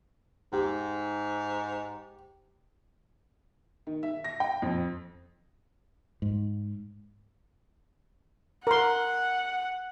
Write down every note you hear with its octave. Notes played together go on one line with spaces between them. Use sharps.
G#2 G4
D#3
E5
A#6
G5
F2
G#2
A#4 F#5 C6